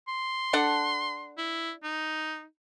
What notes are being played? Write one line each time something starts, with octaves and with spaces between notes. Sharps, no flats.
C6
D4 A4 F#5
E4
D#4